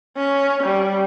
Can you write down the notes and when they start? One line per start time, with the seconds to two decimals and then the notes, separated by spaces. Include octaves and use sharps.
0.17 C#4
0.64 G3